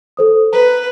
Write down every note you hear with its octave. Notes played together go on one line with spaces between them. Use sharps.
A4 C5 D#6
B4 A#5